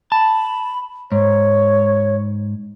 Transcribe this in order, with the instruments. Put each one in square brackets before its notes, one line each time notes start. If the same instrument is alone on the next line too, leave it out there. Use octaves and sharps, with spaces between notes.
[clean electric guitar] A5 [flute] B5
[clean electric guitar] G#2 [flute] C#5